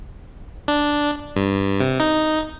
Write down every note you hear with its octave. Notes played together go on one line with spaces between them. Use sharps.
D4
G2
C3
D#4